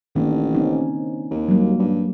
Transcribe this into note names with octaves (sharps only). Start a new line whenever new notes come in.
A1 D#3 A#3 D4
C4 C#4 D#4
D#2
F#3 G3 A#3
G2